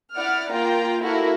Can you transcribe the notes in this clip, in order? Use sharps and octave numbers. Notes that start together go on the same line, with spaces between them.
E4 D5 F#5 F6
A#3 F4 G5 A#5
A#3 E4 F#4 A4 A#4